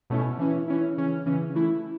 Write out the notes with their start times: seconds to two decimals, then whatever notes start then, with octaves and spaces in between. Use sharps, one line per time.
0.10 B2 A3 C#4 E4
0.39 E3 C#4 E4
0.68 E3 C#4 E4
0.97 C#3 E3 C#4
1.26 C#3 E3 C#4
1.55 E3 A3 E4